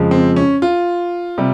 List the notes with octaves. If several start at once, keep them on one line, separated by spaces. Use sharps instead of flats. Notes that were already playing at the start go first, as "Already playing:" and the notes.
Already playing: F2 C#3 F3 G#3
C4
C#4
F4
C3 G3